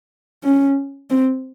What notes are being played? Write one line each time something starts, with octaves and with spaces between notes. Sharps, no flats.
C#4
C4